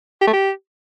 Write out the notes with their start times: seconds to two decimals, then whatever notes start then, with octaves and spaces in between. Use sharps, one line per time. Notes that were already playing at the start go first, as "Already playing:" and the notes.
0.21 G4
0.27 A3
0.33 G4